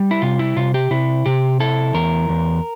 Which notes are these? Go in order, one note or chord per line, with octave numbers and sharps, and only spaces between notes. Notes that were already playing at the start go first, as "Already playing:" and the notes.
Already playing: G3
E4
C3 F4
E4
C3 F4
G4
C3 E4
C3 G4
E4 A4
E2 A#4
E2